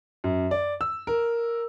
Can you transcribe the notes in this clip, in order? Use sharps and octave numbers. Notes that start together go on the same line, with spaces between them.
F#2
D5
E6
A#4